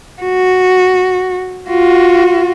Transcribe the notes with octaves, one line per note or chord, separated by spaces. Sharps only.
F#4
F4 F#4